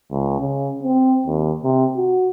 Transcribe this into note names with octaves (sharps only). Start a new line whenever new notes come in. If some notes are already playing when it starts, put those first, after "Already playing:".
C#2
C#3
C4
D#2
C3
F#4